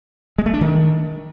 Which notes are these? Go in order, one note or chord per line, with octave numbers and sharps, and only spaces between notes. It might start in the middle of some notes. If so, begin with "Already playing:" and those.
G#3
A3
D4
D#3